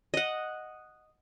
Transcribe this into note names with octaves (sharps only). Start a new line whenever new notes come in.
D#5 F#5